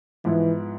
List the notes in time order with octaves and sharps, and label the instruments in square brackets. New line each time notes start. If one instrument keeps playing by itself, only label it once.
[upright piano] G#2 F3 B3 E4 [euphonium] E3